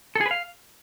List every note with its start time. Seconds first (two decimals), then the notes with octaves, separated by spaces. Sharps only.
0.15 A4
0.21 G#4
0.26 B4
0.31 F5